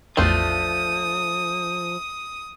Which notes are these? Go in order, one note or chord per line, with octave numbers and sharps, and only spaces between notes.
A1 E2 F3 A3 D4 F4 D#6 G6